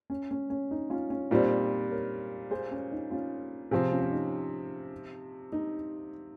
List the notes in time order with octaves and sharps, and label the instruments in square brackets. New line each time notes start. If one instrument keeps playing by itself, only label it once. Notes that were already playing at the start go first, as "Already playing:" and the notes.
[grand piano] C#4
C#4
C#4
D#4
C#4 F4
C#4
[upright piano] A#2 G3 C4 [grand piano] D#4
[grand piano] A#4 C#5
G#4 C5
C#4
D#4
C#4 F4
[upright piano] C3 F3 C4 [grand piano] F4 G#4
[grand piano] C#4 F4
C#4
D#4
D#4